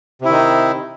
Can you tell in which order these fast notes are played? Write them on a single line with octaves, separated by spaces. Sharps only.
C3 E4 D#3 D#4